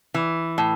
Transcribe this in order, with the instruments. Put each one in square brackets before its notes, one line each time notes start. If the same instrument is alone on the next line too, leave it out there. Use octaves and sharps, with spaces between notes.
[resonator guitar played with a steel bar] E3
A2